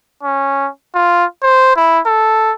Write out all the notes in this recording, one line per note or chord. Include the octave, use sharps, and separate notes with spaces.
C#4
F4
C5
E4
A4